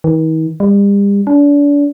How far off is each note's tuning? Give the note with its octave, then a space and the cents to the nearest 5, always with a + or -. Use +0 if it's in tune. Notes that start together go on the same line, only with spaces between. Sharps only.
D#3 +45
G3 +40
D4 -35